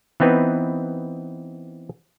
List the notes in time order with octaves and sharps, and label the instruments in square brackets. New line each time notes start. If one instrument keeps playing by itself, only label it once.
[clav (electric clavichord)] E3 B3 C4 D#4 B4